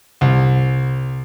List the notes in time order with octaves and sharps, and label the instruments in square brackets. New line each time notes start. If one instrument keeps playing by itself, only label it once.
[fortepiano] C2